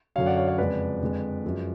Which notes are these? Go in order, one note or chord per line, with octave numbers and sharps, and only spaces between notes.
F#2 D3 F#3 C#5 F5
D5 F#5
C#5 F5
C#5 F5
F2 C#3 G#3 B4 D5
F2 D3 F3 G#3
F#2 F3 G#3